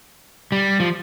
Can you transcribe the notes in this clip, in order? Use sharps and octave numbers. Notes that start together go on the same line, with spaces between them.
G3
F3